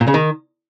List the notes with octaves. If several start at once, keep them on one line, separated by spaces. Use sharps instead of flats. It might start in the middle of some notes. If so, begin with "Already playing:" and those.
A#2
C#3
D#3